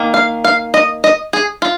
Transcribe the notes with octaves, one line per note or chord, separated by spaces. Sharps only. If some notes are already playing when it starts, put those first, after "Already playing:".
Already playing: D#3 A#3
F5
F5
D#5
D#5
G#4
F4